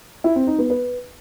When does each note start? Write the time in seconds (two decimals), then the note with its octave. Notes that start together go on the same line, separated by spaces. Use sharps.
0.24 E4
0.36 C4
0.47 D#4
0.59 B3
0.70 B4